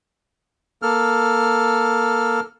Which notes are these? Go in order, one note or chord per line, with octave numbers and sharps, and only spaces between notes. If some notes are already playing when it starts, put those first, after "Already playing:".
A#3 A4 F6